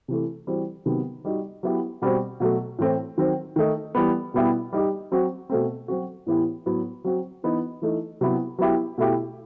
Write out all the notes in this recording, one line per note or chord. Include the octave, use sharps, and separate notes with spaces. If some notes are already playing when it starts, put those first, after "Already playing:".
C3 E3 A3
E3 G3 C4 F#4
C3 D#3 F#3 B3
G3 D#4 F#4
F#3 B3 E4 G4
B2 G3 C4 F#4
B2 F#3 A3
A2 E3 A3 C4
D#3 F#3 C4
D#3 A3 D#4
E3 G3 B3
B2 G3 B3 E4 G4
G3 D#4 G4
F#3 C4 F#4
B2 A3 C4
F#3 C4 F#4
A2 E3 B3 E4 G4
A2 F#3 B3
F#3 C4 F#4
E3 B3 D#4
E3 A3 D#4
C3 F#3 B3 E4 G4
F#3 B3 E4 G4
B2 A3 E4 G4